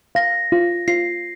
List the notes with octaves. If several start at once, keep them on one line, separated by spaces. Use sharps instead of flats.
F5 A#6
F4
F4 C7